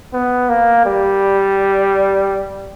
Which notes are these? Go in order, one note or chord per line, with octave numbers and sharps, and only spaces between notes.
B3
A#3
G3